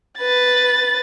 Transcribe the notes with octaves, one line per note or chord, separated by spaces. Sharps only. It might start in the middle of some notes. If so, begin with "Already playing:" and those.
B4 A6